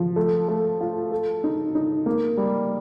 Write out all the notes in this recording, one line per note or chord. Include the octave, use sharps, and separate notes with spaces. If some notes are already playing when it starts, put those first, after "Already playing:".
Already playing: F3
A3
A3
F4
A4
D#4
D#4
A#3
G3